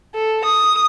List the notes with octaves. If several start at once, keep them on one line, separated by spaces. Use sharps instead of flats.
A4
D#6